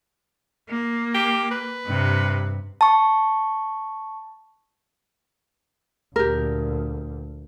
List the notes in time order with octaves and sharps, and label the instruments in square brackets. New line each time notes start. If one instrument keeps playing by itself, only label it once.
[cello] A#3
[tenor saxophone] G4
B4
[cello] G2 C3
[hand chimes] A5 C#6
[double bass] D2 A#2 [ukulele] G4 A#4